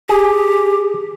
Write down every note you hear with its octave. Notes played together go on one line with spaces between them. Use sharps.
G4 G#4